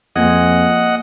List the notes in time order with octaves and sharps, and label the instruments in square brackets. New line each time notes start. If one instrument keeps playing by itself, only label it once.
[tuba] F2 [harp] A#3 C4 G#4 [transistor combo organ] D#5 F#5